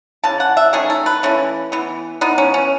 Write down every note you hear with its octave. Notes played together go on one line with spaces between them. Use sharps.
C#3 E3 A5
F#5
E5
D#3 A3 C#4 G#4
A4
B4
E3 A3 C#4
E3 B3
E3 B3 D#4
C#4
C#4